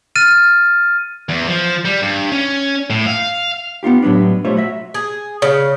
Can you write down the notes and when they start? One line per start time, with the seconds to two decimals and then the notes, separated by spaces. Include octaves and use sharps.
0.16 F6 A6 D#7
1.29 E2
1.47 F3
1.85 G3
2.02 G2
2.32 C#4
2.90 A2
3.06 F5
3.83 B3 D#4 F4 G4
4.02 A2 F#3 G3 B3 D4
4.45 B1 G3 A3 F4 C5 C#5
4.57 F#4 E5
4.94 G#4
5.42 C#3